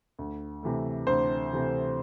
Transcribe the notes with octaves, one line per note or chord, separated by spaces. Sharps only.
D2
C3 E3 A3
D2 C5
C3 E3 A3